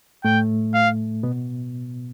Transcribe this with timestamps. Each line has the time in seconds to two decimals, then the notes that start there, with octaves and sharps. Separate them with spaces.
0.24 A2 A3 G5
0.74 F5
1.23 B2 B3